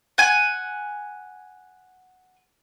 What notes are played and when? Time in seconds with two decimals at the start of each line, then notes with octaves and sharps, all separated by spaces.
0.18 F#5 G#5